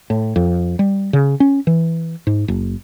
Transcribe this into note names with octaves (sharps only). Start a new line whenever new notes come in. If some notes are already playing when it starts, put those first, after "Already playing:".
A2
F2
G3
C#3
C#4
E3
G#2
F#1